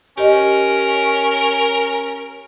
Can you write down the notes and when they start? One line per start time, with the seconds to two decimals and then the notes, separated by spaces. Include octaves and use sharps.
0.18 C#4 G4 A#4 D#5